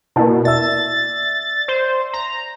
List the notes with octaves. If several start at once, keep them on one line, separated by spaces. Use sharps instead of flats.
B2 A#3 E4 A5
D5 E5 E6 A6
C5
A#5